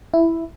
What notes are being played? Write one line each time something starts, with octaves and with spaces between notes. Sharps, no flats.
E4